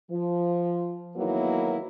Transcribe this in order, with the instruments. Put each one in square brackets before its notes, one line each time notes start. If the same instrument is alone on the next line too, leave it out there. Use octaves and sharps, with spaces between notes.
[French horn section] F3
E2 D#3 F#3 A#3 B3 E4